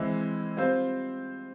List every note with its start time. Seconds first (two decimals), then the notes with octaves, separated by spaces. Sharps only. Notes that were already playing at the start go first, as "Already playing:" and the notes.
Already playing: E3 G#3 C4 E4
0.57 G3 C4 F4 C5